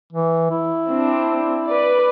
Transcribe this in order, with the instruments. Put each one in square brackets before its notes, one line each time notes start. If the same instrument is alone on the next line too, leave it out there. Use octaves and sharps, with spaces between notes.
[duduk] E3
E4
[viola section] C4 D4
B4 D5